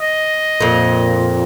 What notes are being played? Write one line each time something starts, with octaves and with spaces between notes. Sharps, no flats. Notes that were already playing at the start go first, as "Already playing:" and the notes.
D#5
F2 A#2